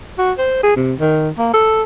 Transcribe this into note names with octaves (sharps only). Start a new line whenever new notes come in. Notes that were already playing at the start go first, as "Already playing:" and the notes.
F#4
C5
G#4
C3
D#3
A#3
A4